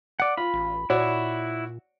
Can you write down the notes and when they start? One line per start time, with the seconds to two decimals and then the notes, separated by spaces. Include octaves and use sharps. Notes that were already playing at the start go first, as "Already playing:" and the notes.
0.20 D5 F#5
0.37 F4 B5
0.54 A1
0.90 A#2 E4 F#4 C#5 D5